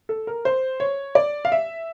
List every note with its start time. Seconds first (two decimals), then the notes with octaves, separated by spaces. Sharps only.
0.09 A4
0.27 A#4
0.45 C5
0.80 C#5
1.15 D5
1.45 F5
1.52 E5